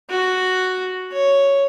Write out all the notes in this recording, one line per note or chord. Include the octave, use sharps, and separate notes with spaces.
F#4
C#5